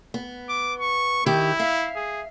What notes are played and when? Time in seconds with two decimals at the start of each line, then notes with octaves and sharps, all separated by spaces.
0.14 B3
0.49 D6
0.80 C#6
1.26 D#3 E4 G4
1.59 E5 F5
1.96 G#4